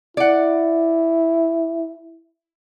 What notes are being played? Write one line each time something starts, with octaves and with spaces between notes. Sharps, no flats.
E4 D5 F#5